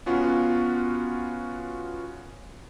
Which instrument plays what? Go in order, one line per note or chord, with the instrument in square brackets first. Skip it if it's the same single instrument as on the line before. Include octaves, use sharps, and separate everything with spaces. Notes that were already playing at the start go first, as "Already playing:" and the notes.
[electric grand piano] B3 C#4 F4 F#4